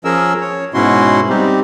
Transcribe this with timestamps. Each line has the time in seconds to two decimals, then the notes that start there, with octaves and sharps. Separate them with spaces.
0.04 F3 C#4 G#4 A#4 E6
0.41 C#5
0.74 G#2 B2 C#4 E4 F#4 C6
1.29 G3 C4 D#4 G4